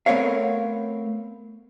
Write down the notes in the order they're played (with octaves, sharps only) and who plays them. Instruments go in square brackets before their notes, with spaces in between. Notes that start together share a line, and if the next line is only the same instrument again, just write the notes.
[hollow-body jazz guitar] A3 B3 C4 A#4 C#5 F5